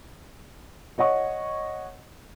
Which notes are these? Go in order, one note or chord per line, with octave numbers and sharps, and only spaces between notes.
C#5 D#5 F#5 C#6